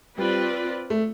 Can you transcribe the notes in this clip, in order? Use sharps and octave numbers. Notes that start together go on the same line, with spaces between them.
G3 C4 F4 B4 D5
A3